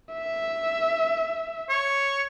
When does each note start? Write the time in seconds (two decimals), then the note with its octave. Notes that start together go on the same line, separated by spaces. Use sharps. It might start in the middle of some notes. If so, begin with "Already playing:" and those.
0.14 E5
1.70 C#5